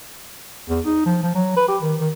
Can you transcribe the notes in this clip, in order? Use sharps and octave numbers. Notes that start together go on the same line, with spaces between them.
E2
D#4
F3
F3
F#3
B4
G4
D#3
D#3